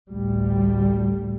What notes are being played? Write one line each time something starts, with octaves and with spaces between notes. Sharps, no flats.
A1 D2 G3